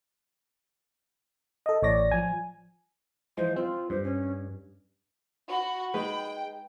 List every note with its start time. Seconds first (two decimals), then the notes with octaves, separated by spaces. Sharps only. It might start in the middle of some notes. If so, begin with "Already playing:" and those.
1.66 A4 D#5
1.82 A1 A2 C#5 D5 A#6
2.11 F3 G#5
3.37 E3 F3 G#3 C5
3.56 C4 F4
3.90 G2 C5
4.04 C#4
5.50 F#4 B5
5.94 G#3 D#4 B4 G5